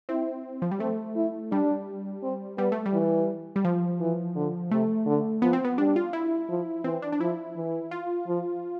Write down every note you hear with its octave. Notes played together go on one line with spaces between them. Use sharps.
C4 E4
F3
G3
A3 C4
E4
G3 D4
C4
G3 B3
A3
G3
E3
G3
F3
E3
D3
C3 A3
D3
F3 B3
C4
B3
G3 D4
F4
E4
F3
E3 C4
D4
D4
F3 E4
E3
F4
F3